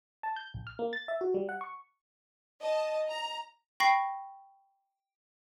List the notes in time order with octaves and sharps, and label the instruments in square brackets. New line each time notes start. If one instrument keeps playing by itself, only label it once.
[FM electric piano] A5
G6
A#1
F6
A#3
A6
E5
F#4
G3
F#5
C#6
[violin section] D#5 A5
A#5
[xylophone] G5 B5 C#6 A#6 C7